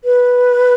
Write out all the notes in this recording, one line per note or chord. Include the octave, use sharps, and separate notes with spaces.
B4